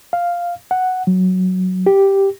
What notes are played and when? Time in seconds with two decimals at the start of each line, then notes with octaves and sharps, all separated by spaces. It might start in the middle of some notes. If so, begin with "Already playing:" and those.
0.13 F5
0.71 F#5
1.07 F#3
1.86 G4